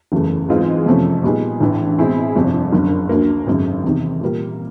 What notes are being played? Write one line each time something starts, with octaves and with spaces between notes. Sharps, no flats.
F#1 E2 C#3 E3 A3
G#2 E3 G#3 C4 F4
F2 C3 F3 A3 C#4
A#2 G3 B3 D#4 G#4
A1 G2 E3
B2 G#3 C4 E4 G#4
G1 F2 C3
F#1 F#2 D3
D2 D3 F#3 A#3
G#1 F#2 C#3
E2 C3 D#3
A#2 G3 A#3